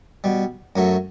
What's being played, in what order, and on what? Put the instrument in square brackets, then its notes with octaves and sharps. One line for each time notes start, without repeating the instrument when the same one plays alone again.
[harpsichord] B2 G3
F#2 F#3 A3